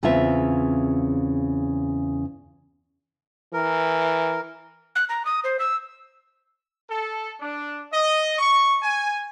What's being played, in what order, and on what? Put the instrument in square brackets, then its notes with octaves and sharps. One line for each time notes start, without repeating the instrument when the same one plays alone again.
[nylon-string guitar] E2 C#3 C4 F4 E5
[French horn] E3 [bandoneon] A#4
[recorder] F#6
A#5
D#6
C5
E6
[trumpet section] A4
D4
D#5
C#6
G#5